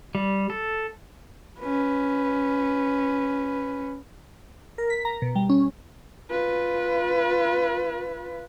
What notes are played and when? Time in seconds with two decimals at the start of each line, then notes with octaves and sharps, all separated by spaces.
0.15 G3
0.50 A4
1.60 C#4 B4
4.78 A#4
4.90 B6
5.05 A#5
5.22 B2
5.35 G3
5.49 C#4
6.31 F4 B4